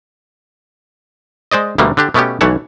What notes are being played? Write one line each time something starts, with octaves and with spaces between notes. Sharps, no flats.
G#3 C5 D5 D#5
D2 B2 D3 G3 A3 A#3
D3 D4 G4
B2 A3 B3 C#4 G4
B1 E3 A3 C#5 F#5 A5